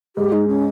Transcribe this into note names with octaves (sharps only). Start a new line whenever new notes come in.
G#2 G4
G#3 D#4
C#4